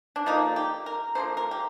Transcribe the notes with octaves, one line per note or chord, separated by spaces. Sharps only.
D4
D3 F3 A#3 D#4
G4
A#4
D3 F3 A#3 C5
A#4
G4